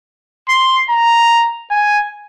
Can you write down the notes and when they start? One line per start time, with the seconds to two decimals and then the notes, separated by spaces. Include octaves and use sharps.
0.49 C6
0.90 A#5
1.71 G#5